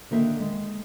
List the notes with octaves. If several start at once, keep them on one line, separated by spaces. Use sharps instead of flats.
D3 D#3 A#3 E5 F5
G#3